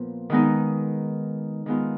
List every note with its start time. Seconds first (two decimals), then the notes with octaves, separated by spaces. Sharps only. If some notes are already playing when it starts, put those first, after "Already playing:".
Already playing: A#2 F3 B3
0.30 D#3 G#3 B3 D#4
1.66 D#3 G#3 B3 F4